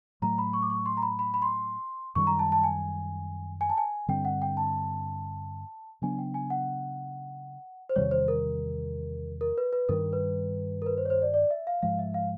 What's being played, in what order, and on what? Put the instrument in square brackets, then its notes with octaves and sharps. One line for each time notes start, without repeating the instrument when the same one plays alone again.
[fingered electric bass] A2 F#3 A3 [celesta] A#5
[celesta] B5
C#6
D6
C#6
C6
A#5
B5
B5
B5
C6
[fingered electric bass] F#2 D#3 G3 [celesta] C#6
[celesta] A#5
A5
A5
G#5
G#5
A5
G#5
[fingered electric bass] G2 D3 G3 C4 [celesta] G5
[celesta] F#5
G5
A5
[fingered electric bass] C#3 F#3 B3 D4 [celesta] G#5
[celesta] G5
G#5
F#5
C5
[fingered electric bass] E2 C3 D#3 G3 [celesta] C#5
[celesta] C5
A#4
A#4
B4
B4
[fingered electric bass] G2 D#3 G3 [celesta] A#4
[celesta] B4
A#4
B4
C5
C#5
C5
D5
D5
E5
F5
[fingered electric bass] G#2 F3 G#3 [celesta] F5
[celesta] E5
F5